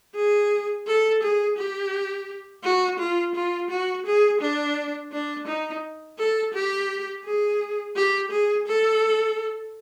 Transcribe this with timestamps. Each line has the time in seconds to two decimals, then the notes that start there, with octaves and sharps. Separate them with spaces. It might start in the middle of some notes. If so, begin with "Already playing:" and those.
0.15 G#4
0.87 A4
1.22 G#4
1.58 G4
2.64 F#4
2.99 F4
3.35 F4
3.70 F#4
4.06 G#4
4.40 D4
5.12 D4
5.47 D#4
6.18 A4
6.54 G4
7.24 G#4
7.96 G4
8.31 G#4
8.67 A4